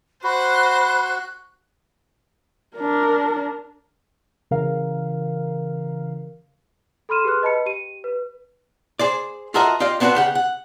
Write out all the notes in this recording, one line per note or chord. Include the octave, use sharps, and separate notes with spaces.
F#4 C5 B5 F#6
D4 A#4
C#3 E3 A#4 F5
A4 B5 C6 F6 D#7 E7
G4 G#4 B4 C6 F6 F#6
B4 D#5 A5 B5 C#7
G4 D#7
B4
G#4 C5 D5
F4 F#4 A4 A#4 D#5 E5
F4 G4 D5 D#5 F5
B3 C4 D4 D#4 F#4 B4
C#3 G4 F#5
F#5